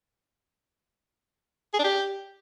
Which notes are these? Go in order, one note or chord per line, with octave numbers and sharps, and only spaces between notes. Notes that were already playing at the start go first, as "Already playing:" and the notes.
G#4
D4
G4